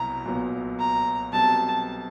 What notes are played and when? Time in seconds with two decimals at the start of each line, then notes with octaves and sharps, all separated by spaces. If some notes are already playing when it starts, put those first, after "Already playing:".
Already playing: C2 B2 F#3 B3 E4 A#5
0.25 B1 A#2 F#3 B3
0.79 A#5
1.32 B1 B2 G3 C4 A5